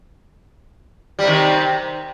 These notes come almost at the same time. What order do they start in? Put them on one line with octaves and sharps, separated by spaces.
G3 C3 D#3